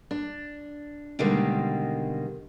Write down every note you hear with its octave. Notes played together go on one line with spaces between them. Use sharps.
D4
B2 D3 D#3 G3 G#3 A#3